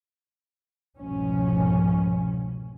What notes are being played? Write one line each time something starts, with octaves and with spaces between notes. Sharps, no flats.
F1 C2 G#2 B2 F3 C#4